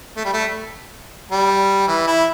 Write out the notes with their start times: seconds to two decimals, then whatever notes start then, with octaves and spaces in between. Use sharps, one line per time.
0.17 A3
0.25 G3
0.33 A3
1.31 G3
1.88 E3
2.07 E4